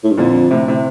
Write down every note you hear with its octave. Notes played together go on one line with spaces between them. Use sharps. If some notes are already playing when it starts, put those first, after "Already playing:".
A2
G2
F2 A#2 D3
A2 C3
A2 C3